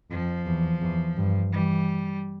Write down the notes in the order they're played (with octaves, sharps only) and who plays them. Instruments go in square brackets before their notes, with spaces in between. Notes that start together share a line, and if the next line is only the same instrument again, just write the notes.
[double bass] F2 [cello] F3
[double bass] E2
E2
G2
[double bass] E3 [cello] G3